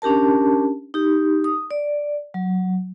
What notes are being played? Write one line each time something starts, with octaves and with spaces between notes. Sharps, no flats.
C#4 D4 G4 A#4 A5
D#4 G4
D#6
D5
F#3